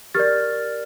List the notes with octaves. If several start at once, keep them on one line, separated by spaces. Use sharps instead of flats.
G4 A#4 D5 F6 A6